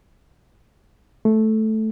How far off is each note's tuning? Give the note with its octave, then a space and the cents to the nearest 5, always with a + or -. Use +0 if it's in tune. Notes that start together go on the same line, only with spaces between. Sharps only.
A3 -10